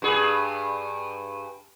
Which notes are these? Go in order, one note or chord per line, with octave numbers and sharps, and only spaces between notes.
G2 G#4